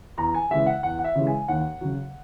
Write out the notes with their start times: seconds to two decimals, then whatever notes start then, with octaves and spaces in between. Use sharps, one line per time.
0.18 E2 A#5
0.34 G#5
0.51 C#3 E3 G#3 E5
0.66 F#5
0.83 E2 F#5
0.99 F#5
1.04 E5
1.16 C#3 E3 G#3
1.27 G#5
1.48 D#2 F#5
1.81 C#3 F#3